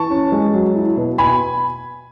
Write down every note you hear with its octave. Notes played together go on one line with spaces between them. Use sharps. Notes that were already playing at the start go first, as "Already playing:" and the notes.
Already playing: E3 A5 C#6
C#4
G#3
F#3
E4
B2
B2 G#5 B5